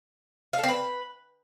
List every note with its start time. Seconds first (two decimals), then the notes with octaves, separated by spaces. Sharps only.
0.53 F5
0.58 A4
0.63 C4
0.69 B4